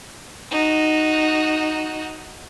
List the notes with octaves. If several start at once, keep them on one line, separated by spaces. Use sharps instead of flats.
D#4 F#4